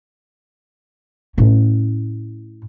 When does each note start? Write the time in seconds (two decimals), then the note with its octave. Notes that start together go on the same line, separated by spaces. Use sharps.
1.38 A2 C#4